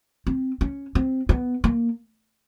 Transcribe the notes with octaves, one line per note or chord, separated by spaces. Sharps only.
C4
C#4
C4
B3
A#3